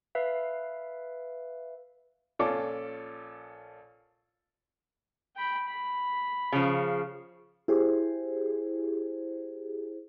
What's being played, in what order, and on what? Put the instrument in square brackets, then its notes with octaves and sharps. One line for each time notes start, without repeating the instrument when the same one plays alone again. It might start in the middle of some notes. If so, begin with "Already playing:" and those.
[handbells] B4 E5 F5
[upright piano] A#1 C#4 F4 A4 D6
[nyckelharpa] G5 B5
B5
[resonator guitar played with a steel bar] C#3 F3
[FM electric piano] E4 G4 G#4 C5